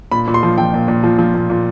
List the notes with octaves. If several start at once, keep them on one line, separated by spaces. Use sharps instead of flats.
A#2 B5
A#2
C6
F3
F3 G5
A#2
A#2
F3
F3
A#2
A#2